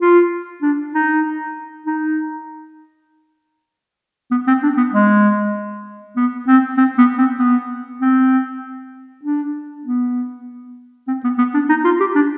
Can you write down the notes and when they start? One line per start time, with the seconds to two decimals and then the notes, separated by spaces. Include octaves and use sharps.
0.02 F4
0.62 D4
0.94 D#4
1.86 D#4
4.31 B3
4.47 C4
4.63 D4
4.77 B3
4.93 G#3
6.17 B3
6.48 C4
6.77 C4
6.98 B3
7.18 C4
7.39 B3
8.01 C4
9.24 D4
9.85 B3
11.08 C4
11.24 B3
11.39 B3
11.54 D4
11.69 D#4
11.85 F4
12.00 G4
12.16 D4